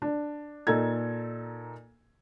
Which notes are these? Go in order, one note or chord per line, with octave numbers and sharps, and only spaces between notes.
D4
A#2 D#4 A4 G#6